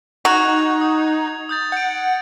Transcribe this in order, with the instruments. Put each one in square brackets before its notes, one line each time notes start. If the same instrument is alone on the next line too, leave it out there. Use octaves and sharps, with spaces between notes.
[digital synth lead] D#4 [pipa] F#4 [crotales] G#6 F7
[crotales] D#6
D#6 G6 A6
[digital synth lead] F#5 [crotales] G6 D7